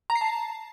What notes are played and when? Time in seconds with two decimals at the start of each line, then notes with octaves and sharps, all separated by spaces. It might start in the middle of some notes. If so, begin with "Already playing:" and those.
0.10 A#5
0.15 C7
0.21 A5